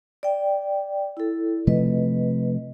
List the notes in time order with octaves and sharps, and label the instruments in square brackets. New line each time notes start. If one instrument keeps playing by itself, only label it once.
[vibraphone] D5 G5
E4 A4
[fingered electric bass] C3 F3 A3 [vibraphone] B4 D#5